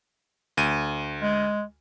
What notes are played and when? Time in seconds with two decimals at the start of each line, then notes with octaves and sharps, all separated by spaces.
0.57 D2 D#7
1.21 G#3